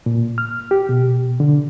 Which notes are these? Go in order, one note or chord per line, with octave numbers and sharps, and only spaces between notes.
A#2
F6
G4
B2
D3